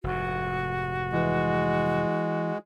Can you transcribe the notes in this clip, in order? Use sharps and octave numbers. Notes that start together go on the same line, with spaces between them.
F1 G#2 F#4
E3 G#3